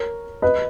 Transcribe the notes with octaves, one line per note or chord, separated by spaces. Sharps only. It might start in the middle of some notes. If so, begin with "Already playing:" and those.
Already playing: A#4 C#5
B4 D#5